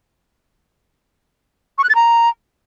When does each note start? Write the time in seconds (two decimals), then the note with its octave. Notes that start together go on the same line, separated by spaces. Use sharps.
1.78 C#6
1.84 F#6
1.89 A6
1.95 A#5